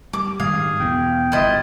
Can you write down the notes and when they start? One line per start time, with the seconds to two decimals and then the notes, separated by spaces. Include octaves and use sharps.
0.13 G3 D6
0.40 G#2 D#3 G3 G#4 F5
0.80 E2 B2 G5
1.32 G1 G2 C3 E4 F4 D#5